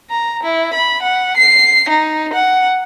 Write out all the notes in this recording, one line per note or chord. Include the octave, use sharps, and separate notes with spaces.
A#5
E4
B5
F#5
C7
D#4
F#5